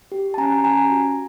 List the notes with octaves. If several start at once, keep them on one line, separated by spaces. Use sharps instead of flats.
G4
A5
C#4 G#5 A#5
C#4 G#5 A#5
F#4